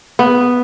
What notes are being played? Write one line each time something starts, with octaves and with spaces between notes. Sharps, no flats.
B3